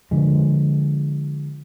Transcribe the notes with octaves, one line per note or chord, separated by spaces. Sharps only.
D3 F3 G#3